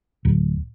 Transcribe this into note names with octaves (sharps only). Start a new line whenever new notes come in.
D1